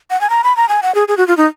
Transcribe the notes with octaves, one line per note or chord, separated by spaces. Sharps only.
F#5
G#5
A#5
B5
A#5
G#5
F#5
G#4
G#4
F#4
F4
D#4